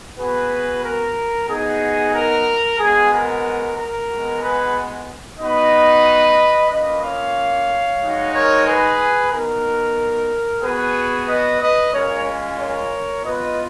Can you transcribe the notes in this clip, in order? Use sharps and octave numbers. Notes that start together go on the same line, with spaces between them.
B3 F#4 G#4 B4
A#4
B3 D#4 F#4 G#4
A#4
G#3 B3 F#4 G#4
A#4
A#4
G#3 B3 F#4
G#4 B4
B3 D#4 F#4 B4 D#5
A#3 C#4 F4 B4 D#5
C#5 F5
G#3 D#4 F#4
A#4 C#5
G#4 B4
B3 D#4 F#4 A#4
B3 F#4 G#4 B4
B4 D#5
B4 D#5
G#3 C#4 F4 A#4 C#5
A#4 C#5
B3 F4 B4 D#5